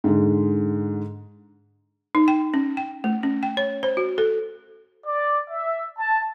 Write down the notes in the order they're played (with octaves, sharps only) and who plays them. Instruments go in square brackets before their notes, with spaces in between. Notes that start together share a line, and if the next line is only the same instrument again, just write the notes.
[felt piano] G#2 D3 G#3
[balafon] D#4
G5
C#4
G5
A3
C#4
G5
C#5
C5
F#4
A4
[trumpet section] D5
E5
A5